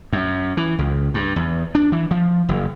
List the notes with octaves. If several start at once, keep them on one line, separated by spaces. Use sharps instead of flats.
F#2
E3
C#2
G2
E2
D4
E3
F3
F#1